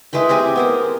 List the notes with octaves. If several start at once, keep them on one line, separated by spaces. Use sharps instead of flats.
G#3 E4 B4 G5
C4 G4 G#4 G#5
B3 A#4 C5